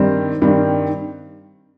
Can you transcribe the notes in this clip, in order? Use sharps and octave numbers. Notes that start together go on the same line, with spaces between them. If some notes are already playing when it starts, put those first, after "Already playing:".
Already playing: G2 D#3 G3 C4
G2 D#3 G3 C4